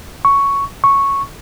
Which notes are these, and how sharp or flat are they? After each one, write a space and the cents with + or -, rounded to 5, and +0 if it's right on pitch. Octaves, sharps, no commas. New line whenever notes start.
C#6 +5
C#6 -5